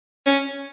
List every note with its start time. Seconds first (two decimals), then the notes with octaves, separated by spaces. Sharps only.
0.26 C#4